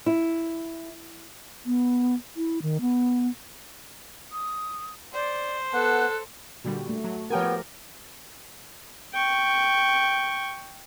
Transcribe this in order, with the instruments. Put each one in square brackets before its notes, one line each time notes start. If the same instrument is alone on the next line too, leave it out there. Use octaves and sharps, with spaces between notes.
[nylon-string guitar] E4
[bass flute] B3
E4
D#3
B3
[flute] D#6
[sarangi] C5 [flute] D5
[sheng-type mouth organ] B3 F#5 [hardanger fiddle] A4 [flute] F#6
[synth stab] A#2 D3 G3 [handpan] F#4
[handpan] A3
[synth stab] F#3
[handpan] F3 G4 A#4 [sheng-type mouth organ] B3 [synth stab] C#5 G5 G#5
[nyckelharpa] G5 C#6